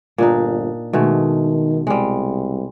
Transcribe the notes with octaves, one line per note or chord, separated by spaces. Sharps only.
G1 A#2 D4 D#4
B2 D#3 G#3 A3
C2 G3 G#3